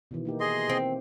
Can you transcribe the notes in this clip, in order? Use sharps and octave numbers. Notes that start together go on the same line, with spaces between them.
B2 D#3 E3
A#3 D#4 G4
G#4 D#5 C6
C4